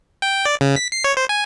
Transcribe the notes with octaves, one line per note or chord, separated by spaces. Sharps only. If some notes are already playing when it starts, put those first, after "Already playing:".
G5
D5
C#3
B6
C7
C#5
C5
G#5